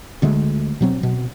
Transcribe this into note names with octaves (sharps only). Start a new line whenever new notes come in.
D2 D3 G#3 A3
B2 F#3 C4
B2